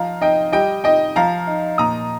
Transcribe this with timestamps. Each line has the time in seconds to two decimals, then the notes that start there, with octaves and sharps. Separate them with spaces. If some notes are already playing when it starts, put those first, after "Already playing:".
Already playing: F3 D#4 F5 A#5
0.21 D#4 D#5 G5
0.53 G3 D#5 G5
0.84 D#4 D#5 G5
1.16 F3 F5 A#5
1.47 D#4
1.78 A#2 A#5 D#6